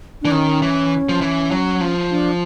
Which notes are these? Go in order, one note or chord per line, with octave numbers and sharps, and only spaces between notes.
E3 D4
D#3 C#4
E3
F3
E3
F#3
F3
D4